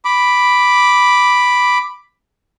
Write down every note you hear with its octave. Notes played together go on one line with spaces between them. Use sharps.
B5 D6